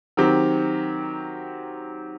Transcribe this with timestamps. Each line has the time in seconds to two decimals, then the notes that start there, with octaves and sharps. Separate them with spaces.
0.17 D#3 F#3 C4 G4